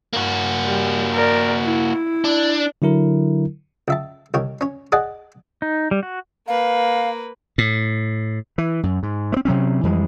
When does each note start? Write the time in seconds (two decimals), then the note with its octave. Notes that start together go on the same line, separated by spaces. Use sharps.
0.13 A#3 F#4
0.63 G3
1.14 A#4 D5
1.62 E4
2.24 D4
2.82 D3 F#3 E4 A#4
3.88 C#2 E5 A5
4.34 C2 D#3 C#5
4.61 C#4 C#5
4.92 G#4 D5 D#5 F#5 G#5 A5
5.62 D#4
5.91 G3
6.03 F#4
6.48 A#3 B4 F5
7.58 A2
8.58 E3
8.83 F#2
9.03 G#2
9.32 A3 C4
9.45 C3 F#3 C4 C#4
9.83 F2 E3 G3 G#3